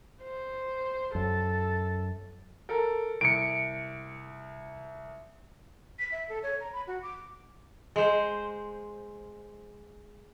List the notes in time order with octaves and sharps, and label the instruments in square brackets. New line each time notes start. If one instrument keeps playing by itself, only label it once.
[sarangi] C5
[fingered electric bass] F#2 [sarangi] A4
[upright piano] A4 A#4
[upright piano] C2 [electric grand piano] C#7 D7
[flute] B6
E5
A4
C#5
A#5
B5
F#4
D6
[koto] G#3 C5